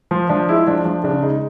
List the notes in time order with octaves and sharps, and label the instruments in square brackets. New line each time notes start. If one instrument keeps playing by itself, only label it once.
[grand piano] F3
F3 D4
G#3 E4
F3 D4
F3 D4
C#3 D4
G#3 D#4